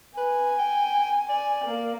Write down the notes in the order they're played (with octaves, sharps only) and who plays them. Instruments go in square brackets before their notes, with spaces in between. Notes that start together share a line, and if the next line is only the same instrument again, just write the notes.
[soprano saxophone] B4 [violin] G#5
[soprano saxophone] G5
[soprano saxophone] D5 [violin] G#5
[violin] A#3